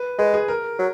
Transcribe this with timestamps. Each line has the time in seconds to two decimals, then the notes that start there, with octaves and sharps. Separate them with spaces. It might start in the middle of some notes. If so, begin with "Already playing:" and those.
Already playing: B4
0.19 G#3 B4
0.34 G#4
0.48 A#4
0.79 F#3